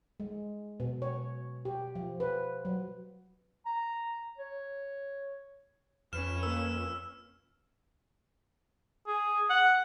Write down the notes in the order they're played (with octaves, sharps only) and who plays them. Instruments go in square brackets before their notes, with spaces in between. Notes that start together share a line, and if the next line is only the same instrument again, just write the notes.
[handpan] G#3
B2
C#5
G4
F3
B4
F#3
[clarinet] A#5
C#5
[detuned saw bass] F2 [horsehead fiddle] C#4 B4 [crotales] F6 E7
[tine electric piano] A#3 A#4 [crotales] E6
[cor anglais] G#4
F#5